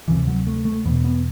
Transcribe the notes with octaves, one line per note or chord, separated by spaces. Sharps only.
D2 C3 E3
F#3
A3
A3
E2 B2 B3
B3